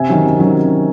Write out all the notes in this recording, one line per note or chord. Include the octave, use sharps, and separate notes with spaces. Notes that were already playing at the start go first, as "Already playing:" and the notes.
Already playing: C3 E5 G#5
D#3 F#3 C#4
C3
D#3 F#3 C#4